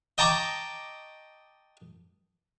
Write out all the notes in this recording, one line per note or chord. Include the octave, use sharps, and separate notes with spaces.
D#5 G5 A5 A#5 C#6 D6